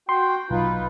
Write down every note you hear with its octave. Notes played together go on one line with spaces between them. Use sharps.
F#4 G5 C6
B1 D#4 F4 B4